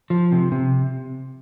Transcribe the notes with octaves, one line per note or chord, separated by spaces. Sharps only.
F3
C3
C3